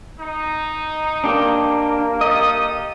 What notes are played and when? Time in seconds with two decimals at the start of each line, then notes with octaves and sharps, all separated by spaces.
0.20 D#4
1.24 A#3 D4 G4
2.21 G4 A4 D#5 D#6